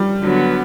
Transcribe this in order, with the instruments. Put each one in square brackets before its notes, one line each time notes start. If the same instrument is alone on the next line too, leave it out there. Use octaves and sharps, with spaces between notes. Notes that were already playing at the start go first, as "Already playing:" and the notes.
Already playing: [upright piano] G3
[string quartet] D3 F#3 B3